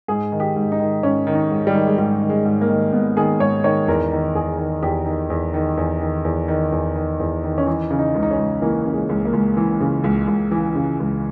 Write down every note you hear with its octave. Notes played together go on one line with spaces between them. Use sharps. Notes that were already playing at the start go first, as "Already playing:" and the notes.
G#2 G#4
D#3
G4
G#2
D#4
D#3
G#2 C#4
D#3
D#4
G#2
G3
D#3
G#3
G#2 G3
D#3
G#3
G#2
A#3
D#3
G#2 B3
D#3 G#4
G#2 C#5
D#3 C#5
E2 A#4
D#3
E2 G#4
D#3
E2 G4
D#3
E2
D#3
E2
D#3
E2
D#3
E2
D#3
E2
D#3
C#4
E3 D#4
C#3
D#4
C#2
D#4
C#4
C#2
E3 A#3
C#3
G#3
C#2
A#3
C#2
E3
C#3
C#2
C#2
E3
C#3
C#2